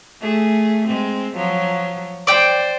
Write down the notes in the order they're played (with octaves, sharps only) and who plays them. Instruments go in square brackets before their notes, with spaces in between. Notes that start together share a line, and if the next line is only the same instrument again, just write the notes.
[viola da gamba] A3 G#4
G#3 C4
F3 F#3
[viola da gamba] C5 [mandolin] D5 G5